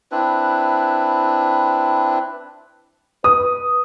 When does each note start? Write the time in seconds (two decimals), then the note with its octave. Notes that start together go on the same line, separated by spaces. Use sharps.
0.12 C4 D4 E4 B4
3.24 B4 D#6